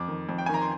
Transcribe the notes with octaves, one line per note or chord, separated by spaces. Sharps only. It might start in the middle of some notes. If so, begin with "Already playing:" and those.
Already playing: F2 D6
D#3
F2
G5
G#5
D#3 A#5
C6